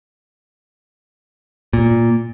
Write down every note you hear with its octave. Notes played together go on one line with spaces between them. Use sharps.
A#2